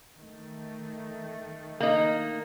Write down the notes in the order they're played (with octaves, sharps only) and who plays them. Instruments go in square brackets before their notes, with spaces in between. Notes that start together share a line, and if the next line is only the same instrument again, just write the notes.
[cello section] D#3 A3
[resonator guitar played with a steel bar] A#3 D#4